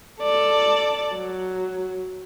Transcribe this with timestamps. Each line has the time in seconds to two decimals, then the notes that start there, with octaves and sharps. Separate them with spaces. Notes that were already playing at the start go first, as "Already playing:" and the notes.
0.22 A4 D5
1.15 F#3